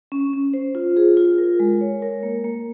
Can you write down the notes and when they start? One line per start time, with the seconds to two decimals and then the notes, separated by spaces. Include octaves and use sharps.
0.12 C#4
0.33 C#4
0.53 C5
0.75 F4
0.97 G#4
1.17 F4
1.38 A#4
1.60 G#3
1.81 C#5
2.02 A#4
2.23 A#3
2.44 A#3